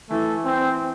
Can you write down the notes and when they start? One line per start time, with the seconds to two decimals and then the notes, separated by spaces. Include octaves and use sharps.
0.10 E3 A3
0.45 C4